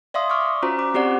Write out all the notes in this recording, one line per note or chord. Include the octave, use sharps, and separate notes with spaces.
D5 E5 F5 C6 D#6
C#6 D6 F6
C#4 F4 F#4 C5 A#5
D6
C4 G4 C5 D5 F#5